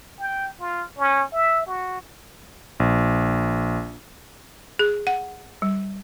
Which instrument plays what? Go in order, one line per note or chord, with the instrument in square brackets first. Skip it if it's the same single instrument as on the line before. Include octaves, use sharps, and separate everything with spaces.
[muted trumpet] G5
F4
C#4
E5
F#4
[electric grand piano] A#1
[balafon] G#4
F#5
G3